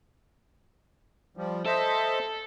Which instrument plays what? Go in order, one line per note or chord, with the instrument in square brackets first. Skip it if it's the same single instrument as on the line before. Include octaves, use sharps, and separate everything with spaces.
[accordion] F3 G3
[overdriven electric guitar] A4 [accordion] C5 D#5 E5